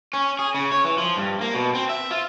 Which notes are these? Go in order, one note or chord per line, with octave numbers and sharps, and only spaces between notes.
C#4
G#4
C#3
C#5
E3
F3
G2
A#3
B2
C4
E5
F4